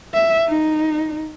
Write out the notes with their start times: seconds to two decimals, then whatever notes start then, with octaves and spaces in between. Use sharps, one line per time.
0.14 E5
0.48 D#4